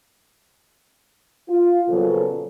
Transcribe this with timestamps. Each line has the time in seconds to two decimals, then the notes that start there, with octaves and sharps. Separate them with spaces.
1.49 F4
1.88 A#2 C#3 F3 F#3 B3 A4